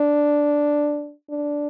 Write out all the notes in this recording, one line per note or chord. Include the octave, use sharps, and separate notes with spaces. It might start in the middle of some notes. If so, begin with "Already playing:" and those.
Already playing: D4
D4